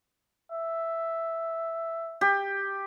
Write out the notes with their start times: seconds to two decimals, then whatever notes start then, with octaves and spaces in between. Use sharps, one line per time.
0.51 E5
2.21 G4